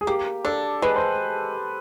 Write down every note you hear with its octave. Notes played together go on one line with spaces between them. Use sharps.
G#4
A#3 G4
D4 A4
G#3 B4
C5